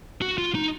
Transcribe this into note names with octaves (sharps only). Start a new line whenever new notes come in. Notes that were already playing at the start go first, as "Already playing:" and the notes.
F#4
F4
D#4